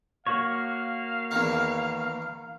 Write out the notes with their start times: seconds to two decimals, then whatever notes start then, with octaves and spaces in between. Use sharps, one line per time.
0.27 A#3 F#4 C#5 F5
1.31 E2 D#3